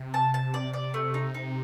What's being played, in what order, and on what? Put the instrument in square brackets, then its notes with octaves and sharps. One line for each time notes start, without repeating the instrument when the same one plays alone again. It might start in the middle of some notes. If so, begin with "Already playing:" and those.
Already playing: [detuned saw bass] C3
[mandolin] A5
A5
D5
D5
A3
D#4
D#4